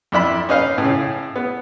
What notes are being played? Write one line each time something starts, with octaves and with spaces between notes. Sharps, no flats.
F2 D4 E4 B5
C#4 D#4 B4 F5
A2 C#3
B3